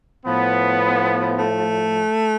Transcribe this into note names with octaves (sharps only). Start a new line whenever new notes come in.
A2 F3 B3
A3